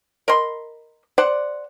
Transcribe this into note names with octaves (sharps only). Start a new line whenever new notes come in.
A#4 D#5 B5 C6
C5 D5 F#5